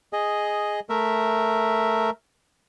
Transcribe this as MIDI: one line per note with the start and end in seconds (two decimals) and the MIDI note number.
0.13 0.80 68
0.13 0.80 75
0.90 2.10 57
0.90 2.10 70
0.90 2.10 76